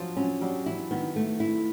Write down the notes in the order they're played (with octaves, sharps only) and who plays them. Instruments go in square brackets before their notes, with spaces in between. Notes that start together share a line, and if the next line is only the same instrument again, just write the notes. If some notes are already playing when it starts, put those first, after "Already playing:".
Already playing: [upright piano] F3 F#3 [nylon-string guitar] F4
[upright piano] F#3 [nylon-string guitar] C#4
[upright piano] F#3 [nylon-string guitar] G3
[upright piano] E3 [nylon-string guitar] E4
[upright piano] D#3 [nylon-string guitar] B3
[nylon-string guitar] A3
E4